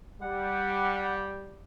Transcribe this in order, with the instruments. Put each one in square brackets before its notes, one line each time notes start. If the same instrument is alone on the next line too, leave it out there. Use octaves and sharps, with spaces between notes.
[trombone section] G3 [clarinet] F#5